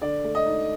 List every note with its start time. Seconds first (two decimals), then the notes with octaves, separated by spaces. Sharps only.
0.01 D3 D5
0.24 A3
0.35 D#5
0.46 D#4